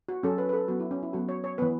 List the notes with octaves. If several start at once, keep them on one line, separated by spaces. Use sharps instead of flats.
F#4
F#3 C#4 A4
B4
B4
A4
F#3 B3 F#4
E4
C#4
E4
F#3 B3 F#4
C#5
C#5
E3 B3 B4